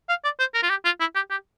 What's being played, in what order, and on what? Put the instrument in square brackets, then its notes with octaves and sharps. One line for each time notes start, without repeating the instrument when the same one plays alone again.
[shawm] F5
D5
C5
A#4
F4
G4
F4
E4
G4
G4